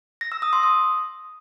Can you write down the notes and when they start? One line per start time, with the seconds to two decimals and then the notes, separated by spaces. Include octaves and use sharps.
0.21 A#6
0.32 E6
0.42 D#6
0.53 C6
0.63 D#6